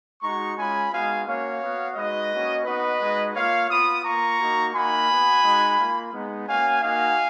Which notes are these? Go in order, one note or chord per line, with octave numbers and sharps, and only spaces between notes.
G#3 D#4 F#4 A#5 C#6
G#3 C#4 F4 G#5 B5
G#3 B3 D#4 F#4 F5 G#5
A#3 C#4 F#4 C#5 F5
B3 F#4
G#3 D#4 F#4 B4 D#5
A#3 C#4 F#4
B3 D#4 F#4 B4 D#5
G#3 D#4 F#4
A#3 F4 C#5 F5
B3 F4 B5 D#6
A#3 F4 A#5 C#6
A#3 D#4 F#4
A#3 D#4 F#4 G#5 B5
B3 F#4
G#3 D#4 F#4
A#3 F4
G#3 B3 D#4
A#3 C#4 F#4 F5 G#5
A#3 D#4 F#4 F5 G#5